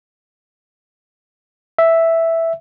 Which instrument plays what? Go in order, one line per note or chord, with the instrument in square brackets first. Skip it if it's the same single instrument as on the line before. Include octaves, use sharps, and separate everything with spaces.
[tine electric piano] E5